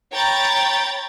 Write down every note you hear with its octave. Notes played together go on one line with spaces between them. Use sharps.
C#5 G5 A#5 B5 G6 A6